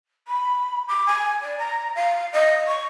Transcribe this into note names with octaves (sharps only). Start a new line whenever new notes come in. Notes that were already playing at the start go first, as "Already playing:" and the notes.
B5
D6
G#5
D5
A#5
F5
D#5
C#6